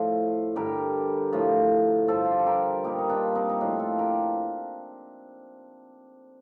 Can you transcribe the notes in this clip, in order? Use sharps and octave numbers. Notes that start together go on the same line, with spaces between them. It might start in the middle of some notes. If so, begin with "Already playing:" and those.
Already playing: A2 F3 A4 C5
G2 D3 G3 G4 A#4
A2 F3
G2 F3 A4 C5
F4
G4
A4
G4 A#4
A#2 G3 D#4 G4
D#4
D4 F4
C4 D#4
D#4
A2 F3 D4 F4
F4 A4
G4 A#4